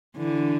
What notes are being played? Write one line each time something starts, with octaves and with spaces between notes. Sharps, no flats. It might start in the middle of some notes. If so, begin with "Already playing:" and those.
D3 E3